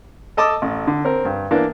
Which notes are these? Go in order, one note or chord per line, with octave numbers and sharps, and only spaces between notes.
A4 D#5 A5 D6 E6
A1
D3
C4 A#4
G2
E3 A#3 B3 D4